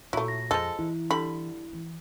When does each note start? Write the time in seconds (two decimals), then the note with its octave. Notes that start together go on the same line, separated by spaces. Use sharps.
0.13 A#2 F#3 A3 E4
0.28 A#6
0.51 F2 F3 G#3 A4
0.79 E3 E4
1.11 D3 G3 B5
1.73 E3